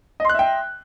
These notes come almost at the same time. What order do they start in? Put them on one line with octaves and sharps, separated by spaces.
D#5 C6 F#6 E5 G5